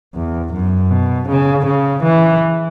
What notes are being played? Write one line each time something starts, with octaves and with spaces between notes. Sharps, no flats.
E2
F#2
B2
C#3
C#3
E3